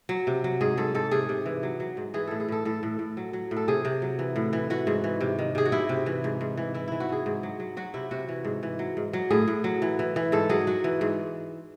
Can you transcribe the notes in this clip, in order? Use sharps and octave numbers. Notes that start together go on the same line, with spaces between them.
F#3
C3
F#3
G#2 G#4
G#2 A4
G#2 A4
C3 G#4
C3
E3
F#3
F#3
G#2
E3 G#4
A2 A4
G#4
A2 A4
A2 A4
A2
A2
F#3
F#3
A2
A4
C3 G#4
C3
F#3
E3
A2
E3
E3 F#4
G#2
E3
C3
D#3
C3 G#4
F#4
C3 E4
C3
E3
G#2
G#2
E3
E3 E4
E3 E4
F#4
E3 G#4
G#2
F#3
F#3
F#3 F#4
C3 E4
C3 F#4
E3
G#2
E3
F#3
G#2
F#3
A2 G#4
A2
F#3
E3
E3
E3
G#2 A4
F#3 G#4
F#3 F#4
E3
G#2